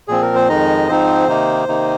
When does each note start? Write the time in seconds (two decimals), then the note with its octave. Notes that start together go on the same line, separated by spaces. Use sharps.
0.08 A#2 F3 C4 G#4
0.22 A#4
0.35 C5
0.49 F2 D#3 G#3 D#4 D#5
0.88 G#2 F3 C4 D#4 C5
1.28 C3 D#3 A#3 D#4
1.68 C3 D#3 A#3 D#4